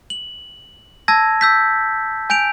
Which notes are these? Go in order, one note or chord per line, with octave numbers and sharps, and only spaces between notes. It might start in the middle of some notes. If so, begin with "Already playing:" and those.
F#7
A5 E6 G#6 A#6
E6 G6 B6
G#5 G6 D7 F7